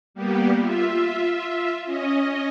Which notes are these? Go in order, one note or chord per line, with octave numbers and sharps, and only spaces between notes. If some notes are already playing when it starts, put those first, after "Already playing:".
G3 A#3 B3 G4
F4 E5
C#4 D#5